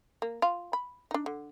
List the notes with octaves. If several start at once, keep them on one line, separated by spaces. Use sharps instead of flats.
A#3
F4
B5
D4 D#4
D3